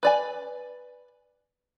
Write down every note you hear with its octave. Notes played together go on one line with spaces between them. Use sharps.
B4 D5 G#5